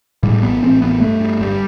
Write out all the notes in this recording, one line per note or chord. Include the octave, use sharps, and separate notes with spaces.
A2 G3
A1 B3
A1 C4
A1 B3
G2 A3
G2
G1 G3